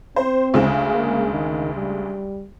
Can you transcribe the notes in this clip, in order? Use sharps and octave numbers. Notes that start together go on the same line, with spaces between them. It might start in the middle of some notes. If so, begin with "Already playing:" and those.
C4 C5
D2 C#3 G#3
A#3
D#3
G3